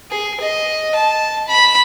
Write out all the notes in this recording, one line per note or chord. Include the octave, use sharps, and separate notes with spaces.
G#4
D#5
A5
B5